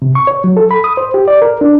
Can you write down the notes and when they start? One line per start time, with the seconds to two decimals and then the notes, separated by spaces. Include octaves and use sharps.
0.02 C3
0.15 C#6
0.27 C#5
0.44 F#3
0.57 A4
0.71 B5
0.84 D#6
0.97 C5
1.14 G4
1.28 D5
1.42 A#4
1.61 D4